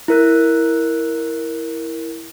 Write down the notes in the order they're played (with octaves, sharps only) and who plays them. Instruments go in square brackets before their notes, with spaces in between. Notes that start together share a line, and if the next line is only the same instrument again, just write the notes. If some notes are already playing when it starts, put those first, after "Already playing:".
[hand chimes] E4 A#4 F#6